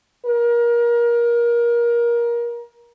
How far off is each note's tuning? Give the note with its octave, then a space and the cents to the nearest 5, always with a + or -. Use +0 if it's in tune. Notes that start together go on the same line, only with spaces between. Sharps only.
A#4 +25